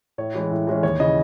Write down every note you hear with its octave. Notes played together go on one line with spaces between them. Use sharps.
A2 C#5
E3 G#3 C#4
A2
E3 G#3 C#4
D#2 C#5
C#3 E3 D#5